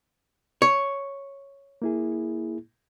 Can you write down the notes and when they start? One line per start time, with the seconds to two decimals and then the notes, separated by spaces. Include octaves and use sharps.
0.62 C#5
1.82 A#3 E4 G#4